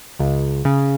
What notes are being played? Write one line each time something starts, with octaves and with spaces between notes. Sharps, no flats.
C#2
C#3